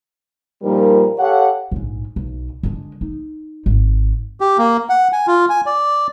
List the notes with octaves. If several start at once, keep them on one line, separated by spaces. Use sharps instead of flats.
A#2 F3 G3 A#3 D#4 A#4
G4 A4 C#5 F5 F#5
A#1 G#2
B1
D3 G#3
D#4
G#1
G4
A#3
F#5
G#5
F4
G#5
D5